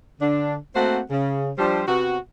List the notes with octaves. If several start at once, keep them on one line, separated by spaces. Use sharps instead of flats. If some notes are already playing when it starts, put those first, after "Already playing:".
D3 D4
A3 A#3 C4 F#4 C5 F#5
C#3
F3 G3 D4 G4 C5
C3 B3 F#4